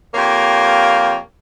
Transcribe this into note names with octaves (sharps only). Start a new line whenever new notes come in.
F2 A#3 G4 C#5 F5